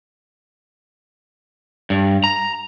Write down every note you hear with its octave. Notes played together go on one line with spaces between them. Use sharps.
G2
A#5